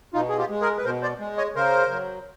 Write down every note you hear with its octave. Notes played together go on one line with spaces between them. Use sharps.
B2 D#4 F4
G#4
F4 G4
G#3
G#4 A#4
B4
B2 A#4 C5
C5 D5
G#3
C#5 D#5
C#3 A#4 C5
F#3